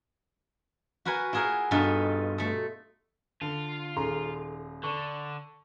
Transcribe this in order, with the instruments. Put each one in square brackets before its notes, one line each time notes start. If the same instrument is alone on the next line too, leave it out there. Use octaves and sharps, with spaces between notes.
[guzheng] F#4 A#4 B4 F#5 G#5
E4 F4 G#4 A#4 F#5
G2 B2 D#4 F4 A4
A3 A4
[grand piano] D3 [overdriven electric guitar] F4 [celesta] A5
[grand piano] D#1 A#5 C6 [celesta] D#4 G#4 A4
[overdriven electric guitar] D3 [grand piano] A4 [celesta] C#6